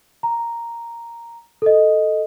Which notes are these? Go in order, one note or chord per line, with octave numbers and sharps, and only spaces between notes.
A#5
A4 D#5